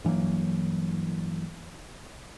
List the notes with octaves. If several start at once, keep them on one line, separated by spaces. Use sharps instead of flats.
G2 E3 F#3 A#3